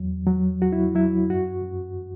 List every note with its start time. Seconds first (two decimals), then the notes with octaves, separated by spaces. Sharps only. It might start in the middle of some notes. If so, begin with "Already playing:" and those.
Already playing: E2 F#3
0.26 F#3
0.62 F#3 F#4
0.73 E4
0.95 F#3 E4
1.30 F#2 F#4
1.64 F#2